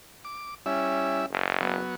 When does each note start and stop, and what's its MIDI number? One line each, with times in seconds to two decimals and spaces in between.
0.25 0.54 86
0.66 1.26 55
0.66 1.24 61
0.66 1.26 64
0.66 1.26 76
1.30 1.79 30
1.61 1.95 54
1.61 1.95 59